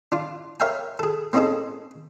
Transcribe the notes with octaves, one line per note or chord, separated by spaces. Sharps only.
D4 F4
A#4 C#5 E5 F5 G5 G#5
G#4 A4
A#3 C4 C#4 D#4 G#4 A4